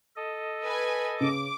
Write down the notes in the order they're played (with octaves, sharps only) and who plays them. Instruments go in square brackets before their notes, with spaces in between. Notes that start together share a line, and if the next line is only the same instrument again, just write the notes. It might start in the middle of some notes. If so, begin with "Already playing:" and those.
[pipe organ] A4 D#5
[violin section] B4 G#5
[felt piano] C#3 C#4 [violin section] D6